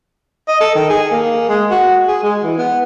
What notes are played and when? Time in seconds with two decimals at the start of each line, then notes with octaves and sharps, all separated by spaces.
0.48 D#5
0.61 A4
0.75 D#3
0.89 G#4
1.11 A#3
1.49 G#3
1.71 F#4
2.08 G#4
2.23 G#3
2.43 E3
2.58 B3